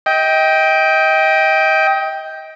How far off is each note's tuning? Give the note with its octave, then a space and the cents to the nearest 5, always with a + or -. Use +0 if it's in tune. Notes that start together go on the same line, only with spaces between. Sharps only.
D#5 +30 G5 +0